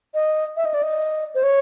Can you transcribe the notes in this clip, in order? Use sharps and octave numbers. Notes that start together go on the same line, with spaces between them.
D#5
E5
D#5
D5
D#5
C5
C#5